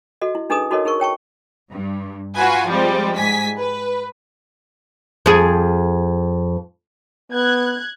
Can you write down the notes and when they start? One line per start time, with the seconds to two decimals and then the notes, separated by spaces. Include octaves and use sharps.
0.22 F#4 A4 D#5
0.35 E4
0.50 D4 D#4 G#4 A4 B4 D#6
0.71 D#4 F#4 A4 A#4 C#5 D#5
0.85 D#4 G#4 A#4 C#6
1.00 C#5 G5 A5 C#6
1.72 G2
2.36 F4 F#4 B4 G#5
2.67 F3 G3 G#3 C4
3.17 G#2 G#5 B6
3.59 B4
5.26 F2 G#4
7.32 B3 F#6 G#6